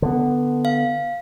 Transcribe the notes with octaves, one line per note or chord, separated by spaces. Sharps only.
D3 B3
F5